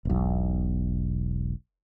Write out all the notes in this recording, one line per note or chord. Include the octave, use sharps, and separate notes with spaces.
E1 B1